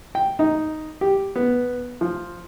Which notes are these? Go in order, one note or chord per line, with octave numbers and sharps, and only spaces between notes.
G5
D#4
G4
B3
F3